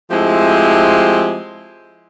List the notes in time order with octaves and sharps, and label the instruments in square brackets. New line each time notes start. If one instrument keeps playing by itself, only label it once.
[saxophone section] F3 G#3 A3 C4 E4 G4